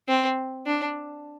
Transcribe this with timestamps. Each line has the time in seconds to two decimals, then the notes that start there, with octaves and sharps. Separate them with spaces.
0.08 C4
0.66 D4